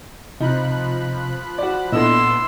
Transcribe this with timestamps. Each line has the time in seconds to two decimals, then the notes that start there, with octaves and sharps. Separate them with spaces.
0.40 C3 F3 D#4 B5 F#6
1.58 F#4 D5
1.92 A#2 B3 D4 E4 A4 D#5 C6 E6